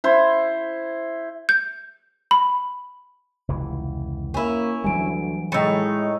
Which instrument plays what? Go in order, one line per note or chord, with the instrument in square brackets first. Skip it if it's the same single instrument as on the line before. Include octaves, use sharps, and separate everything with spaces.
[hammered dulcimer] E4 C5
[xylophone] G6
B5
[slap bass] F1 C#2 E3
[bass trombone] A#3 [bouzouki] C#4 E4
[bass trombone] D2 [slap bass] E3 F#3 G3 [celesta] G#5 D7
[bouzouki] A2 D#4 [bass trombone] G#3 [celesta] G5 E6 C#7